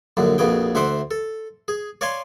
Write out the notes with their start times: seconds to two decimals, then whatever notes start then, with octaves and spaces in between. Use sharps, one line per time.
0.17 A#1 F#2 D3
0.38 A#1 F2 B2 G#4 G5
0.75 D2 C5 E5 F#5 C6 D6
1.11 A4
1.68 G#4
2.01 C#5 D5 F5 G#5 A5 C6